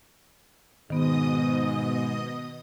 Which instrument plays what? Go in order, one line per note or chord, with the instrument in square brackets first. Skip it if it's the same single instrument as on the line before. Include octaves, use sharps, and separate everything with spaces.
[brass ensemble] G#2 [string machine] B2 D#5 D#6 [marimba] D#3 B3